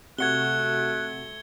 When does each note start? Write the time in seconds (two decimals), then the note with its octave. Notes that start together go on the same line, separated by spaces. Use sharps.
0.18 C3 A3 F#4 F#6 G#6 C#7 G7